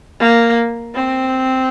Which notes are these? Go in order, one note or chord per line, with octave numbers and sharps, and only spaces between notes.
A#3
C4